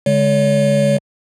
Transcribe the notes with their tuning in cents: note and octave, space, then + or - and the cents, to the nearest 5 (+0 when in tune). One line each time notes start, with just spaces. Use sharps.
D3 -40 G#3 +0 C#5 +35